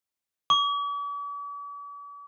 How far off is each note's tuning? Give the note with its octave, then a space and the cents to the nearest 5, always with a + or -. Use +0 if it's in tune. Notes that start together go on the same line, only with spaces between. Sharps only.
D6 -45